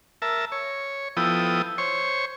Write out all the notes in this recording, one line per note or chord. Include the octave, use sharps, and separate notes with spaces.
A#4 E5 A5
C#5
F3 B3 E4 A4 G5 D#6
C5 C#5 C#6